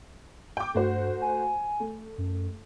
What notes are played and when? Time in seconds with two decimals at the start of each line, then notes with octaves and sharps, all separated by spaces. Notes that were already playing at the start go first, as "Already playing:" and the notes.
0.57 G5 D6
0.74 G2 A3 F#4 C5
1.22 G#5
1.80 A3
2.18 F#2